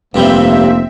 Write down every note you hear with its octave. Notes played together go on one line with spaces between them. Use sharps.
F1 G2 G3 A#3 C4 E5